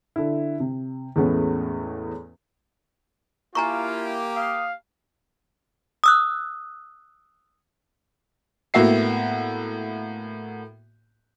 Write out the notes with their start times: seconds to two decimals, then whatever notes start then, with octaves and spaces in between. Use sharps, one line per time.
0.16 D3 E4
0.60 C3
1.16 E2 A2 G#3 A3 B3 C#4
3.55 A#3 E4 F4 G4 G#5 A#5 C#6
4.36 F5 D#6
6.04 D#6 E6 F#6
8.74 A2 A#3 B3 F#4 E5 C7